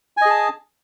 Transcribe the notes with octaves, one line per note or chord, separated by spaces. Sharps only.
G#4 D#5 G#5 A5